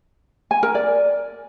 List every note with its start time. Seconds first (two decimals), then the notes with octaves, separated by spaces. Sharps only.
0.51 G#5
0.63 A#4
0.75 D5